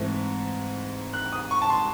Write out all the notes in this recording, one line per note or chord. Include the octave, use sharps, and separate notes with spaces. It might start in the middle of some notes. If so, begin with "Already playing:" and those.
Already playing: G#2 E3 A3 C4
F#6
D#6
C#6
A5
C6